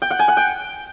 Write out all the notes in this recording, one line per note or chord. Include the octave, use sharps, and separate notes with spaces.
G5
F#5
G#5
F#5
G5